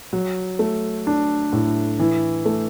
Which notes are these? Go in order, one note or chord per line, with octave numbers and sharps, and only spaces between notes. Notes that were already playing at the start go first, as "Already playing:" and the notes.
F#3
A3
D4
A2
E3
A3